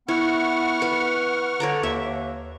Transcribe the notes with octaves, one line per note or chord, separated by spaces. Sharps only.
B3 E4 F#5 C#6 F6
B4
D3 C#5 D5 A#5
D#2 E5